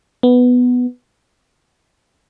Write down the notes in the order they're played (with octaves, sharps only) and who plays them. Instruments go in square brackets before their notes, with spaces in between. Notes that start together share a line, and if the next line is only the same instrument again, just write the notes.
[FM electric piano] B3